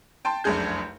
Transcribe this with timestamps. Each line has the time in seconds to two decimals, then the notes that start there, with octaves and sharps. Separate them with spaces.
0.25 G5 A5 C6
0.44 F1 C2 F#2 D4 G#4 G6